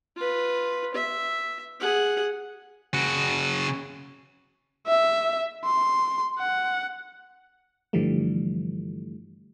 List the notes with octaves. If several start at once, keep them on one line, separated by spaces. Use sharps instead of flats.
F4 B4
E5
G#4 F#5
C#3 F#4
E5
C6
F#5
G2 D3 E3 F3 G3 A3